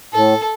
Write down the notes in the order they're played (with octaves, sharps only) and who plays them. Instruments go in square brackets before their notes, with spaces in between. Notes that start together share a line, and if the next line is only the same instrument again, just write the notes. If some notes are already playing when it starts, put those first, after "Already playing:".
[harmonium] A2 [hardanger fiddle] A4